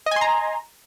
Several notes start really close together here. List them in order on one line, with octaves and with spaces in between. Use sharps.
D#5 G#5 C6 A#5